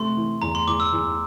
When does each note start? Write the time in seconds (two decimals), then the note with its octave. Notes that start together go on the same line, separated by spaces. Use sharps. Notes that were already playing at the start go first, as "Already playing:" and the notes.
Already playing: C3 A3 C6
0.17 E3
0.42 E2 A#5
0.55 C6
0.67 E2 D6
0.80 E6
0.92 E2